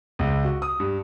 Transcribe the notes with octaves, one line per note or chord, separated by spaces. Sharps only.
C#2
F#4
D#6
G2